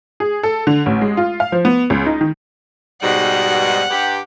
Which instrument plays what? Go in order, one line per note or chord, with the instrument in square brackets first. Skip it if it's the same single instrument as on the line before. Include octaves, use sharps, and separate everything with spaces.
[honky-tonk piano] G#4
A4
D3
A1
G#3
F4
F5
F3
B3
C#2
D#4
D#3
[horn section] G#2 B2 G3 [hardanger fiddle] F#5
[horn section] G2 G4